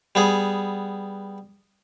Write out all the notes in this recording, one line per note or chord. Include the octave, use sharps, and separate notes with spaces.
G3 B3 G#4